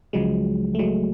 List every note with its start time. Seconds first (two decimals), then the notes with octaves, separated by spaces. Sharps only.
0.13 C#2 C#3 F3 F#3 G#3
0.75 A3
0.79 F#3 G#3